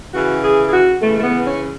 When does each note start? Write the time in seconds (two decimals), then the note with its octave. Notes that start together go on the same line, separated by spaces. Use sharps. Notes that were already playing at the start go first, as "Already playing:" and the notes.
0.14 C#3 E3 F#4
0.43 G#4
0.69 G#4
0.73 F#4
1.01 C#3 E3 A3
1.18 A3
1.23 B3
1.46 C#4